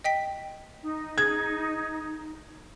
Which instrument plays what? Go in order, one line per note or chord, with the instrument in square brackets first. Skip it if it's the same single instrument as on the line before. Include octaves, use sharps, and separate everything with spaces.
[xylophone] D#5 G5 B6
[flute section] D#4
[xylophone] G#4 [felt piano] G#6